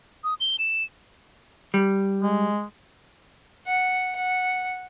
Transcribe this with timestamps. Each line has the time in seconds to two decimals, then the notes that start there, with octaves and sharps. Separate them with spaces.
0.24 D#6
0.40 G7
0.59 E7
1.74 G3
2.22 G#3
3.67 F#5
4.16 F#5